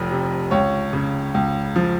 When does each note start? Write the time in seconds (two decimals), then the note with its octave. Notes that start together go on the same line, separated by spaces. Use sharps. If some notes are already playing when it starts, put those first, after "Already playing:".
Already playing: F1 F2
0.11 C3
0.51 C#2 C#5
0.93 C#3
1.34 C#2
1.76 F3